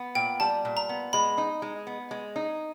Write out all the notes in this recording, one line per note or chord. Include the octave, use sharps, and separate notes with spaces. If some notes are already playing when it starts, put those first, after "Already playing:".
Already playing: B3
A#2 G5
G3 A5
A#2
A#5
B3
G#3 B5
D#4
G#3
B3
G#3
D#4